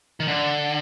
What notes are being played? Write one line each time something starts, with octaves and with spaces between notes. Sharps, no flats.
D#3
D3